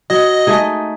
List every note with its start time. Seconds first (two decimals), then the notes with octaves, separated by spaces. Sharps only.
0.10 F#3 D#5
0.47 A3 D#4 G#4